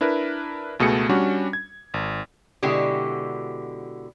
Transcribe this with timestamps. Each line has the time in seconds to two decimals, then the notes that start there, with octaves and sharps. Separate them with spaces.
0.01 D4 E4 A#4 B4
0.79 C#2 B2 A3 G#4 C#7
1.09 G3 C#4 D4 F#4
1.53 G#6
1.94 G#1
2.63 B2 D3 G#3 E4 F#4 G4